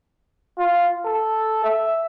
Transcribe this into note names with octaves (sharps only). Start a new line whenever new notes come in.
F4
A4
E5